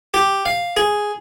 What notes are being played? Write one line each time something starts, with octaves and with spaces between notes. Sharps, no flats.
G4
F5
G#4